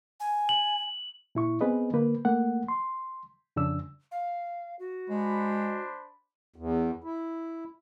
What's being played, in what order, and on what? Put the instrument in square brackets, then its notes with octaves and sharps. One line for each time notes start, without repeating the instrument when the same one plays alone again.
[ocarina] G#5
[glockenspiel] F#7
[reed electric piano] A#2 E4 C#6
B3 C4 G#4 B4 D#5
D3 A#3 B4
A3 A#3 F#5
C6
F2 C#3 D4 E6
[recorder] F5
F#4
[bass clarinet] G#3 [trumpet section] D4 C5 B5
[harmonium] E2
E4